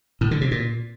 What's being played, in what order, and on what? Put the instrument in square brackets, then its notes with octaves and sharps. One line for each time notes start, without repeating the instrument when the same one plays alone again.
[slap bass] A2
D3
C3
A#2